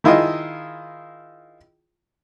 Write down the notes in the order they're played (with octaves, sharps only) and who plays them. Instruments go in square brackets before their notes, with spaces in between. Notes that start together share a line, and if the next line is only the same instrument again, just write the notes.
[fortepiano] D#3 E4 F4 G#4 D#5